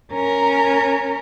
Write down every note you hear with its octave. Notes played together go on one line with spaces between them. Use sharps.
C#4 A#4